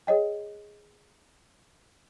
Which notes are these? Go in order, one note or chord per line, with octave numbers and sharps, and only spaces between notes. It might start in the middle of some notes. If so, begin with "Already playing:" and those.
G#4 C#5 D#5 G5